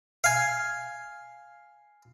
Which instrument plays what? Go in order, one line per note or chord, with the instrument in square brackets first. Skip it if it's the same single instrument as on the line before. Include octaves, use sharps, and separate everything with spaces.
[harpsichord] F5 G#5